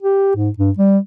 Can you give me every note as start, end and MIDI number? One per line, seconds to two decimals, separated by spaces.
0.03 0.31 67
0.36 0.49 44
0.58 0.71 43
0.78 0.98 55